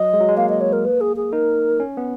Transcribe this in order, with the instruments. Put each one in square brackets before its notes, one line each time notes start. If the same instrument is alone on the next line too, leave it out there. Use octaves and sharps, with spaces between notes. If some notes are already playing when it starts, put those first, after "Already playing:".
Already playing: [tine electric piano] F#3 [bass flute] D#5
[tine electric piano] G#3
F#3
G#3
[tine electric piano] A#3 [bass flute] F5
[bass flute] D#5
C#5
A#4
B4
G#4
G#4
[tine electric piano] D#4 [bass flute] A#4
[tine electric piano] C#4
B3